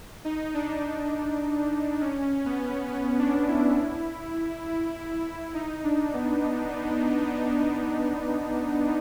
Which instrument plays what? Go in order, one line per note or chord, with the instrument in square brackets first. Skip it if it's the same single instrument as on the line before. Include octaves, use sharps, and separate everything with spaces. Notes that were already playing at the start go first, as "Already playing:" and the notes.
[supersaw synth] D#4
D4
D#4
C#4
B3
B3
D4
E4
D#4
D4
B3